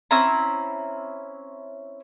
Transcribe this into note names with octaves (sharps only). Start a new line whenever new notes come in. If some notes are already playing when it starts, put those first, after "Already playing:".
C4 C#4 E4 A#5